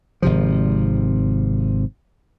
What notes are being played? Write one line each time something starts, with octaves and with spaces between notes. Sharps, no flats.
G#1 C3 F3